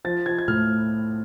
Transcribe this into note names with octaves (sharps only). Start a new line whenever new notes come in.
F3 A6
F3 G#6
G#6
A2 F6